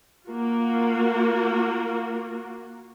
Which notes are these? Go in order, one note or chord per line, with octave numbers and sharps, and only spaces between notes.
A#3 F4 F#4